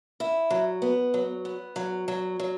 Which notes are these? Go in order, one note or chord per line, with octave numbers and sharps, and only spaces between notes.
E4
F#3
B3
F#3
B3
F#3
F#3
F#3